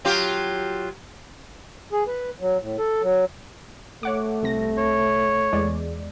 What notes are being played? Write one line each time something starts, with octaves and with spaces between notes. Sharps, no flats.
F#3 F4 G4
G#4
B4
F#3
A2
A4
F#3
A3 C#5 F#5 D6
C2 C3 A#6
C#5
E2 G#3 D5